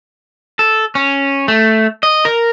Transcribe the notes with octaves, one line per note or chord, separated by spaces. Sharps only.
A4
C#4
A3
D#5
A#4